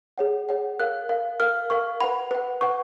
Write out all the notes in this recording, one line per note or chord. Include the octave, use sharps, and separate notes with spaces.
G#4 C#5 F#5
G#4 C#5 F#5
A#4 F5 F#6
A#4 F5
A#4 F5 F6
A#4 F5 C#6
B4 F#5 B5
B4 F#5
B4 F#5 C#6